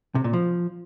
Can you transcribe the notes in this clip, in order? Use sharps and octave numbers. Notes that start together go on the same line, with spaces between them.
C3
A#2
F3